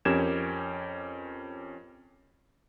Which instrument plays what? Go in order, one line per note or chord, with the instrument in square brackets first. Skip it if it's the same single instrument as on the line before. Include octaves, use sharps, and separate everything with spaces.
[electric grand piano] F2 C#4 G4 A#4 G#6 E7